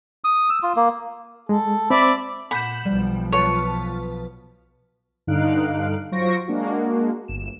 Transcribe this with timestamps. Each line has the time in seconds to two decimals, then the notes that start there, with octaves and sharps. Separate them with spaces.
0.24 D#6
0.50 E6
0.63 F4
0.76 A#3
1.49 G#3 A4
1.90 C4 D5 E5 B5
2.51 A#2 F#5 B5 G6 E7
2.85 B1 F3 G3
3.32 F4 B4 C#5 A5
5.27 G2 D3 D#4 F5 F#6 D7
6.12 F#3 F4 C5 C#6 A#6 D7
6.48 G#3 A#3 D4 F#4
7.28 G1 E7